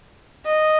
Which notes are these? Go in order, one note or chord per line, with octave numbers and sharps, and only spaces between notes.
D#5